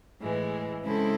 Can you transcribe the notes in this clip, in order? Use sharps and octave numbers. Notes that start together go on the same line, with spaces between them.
A2 E3 G#3
C#3 G#3 C4 E4 A4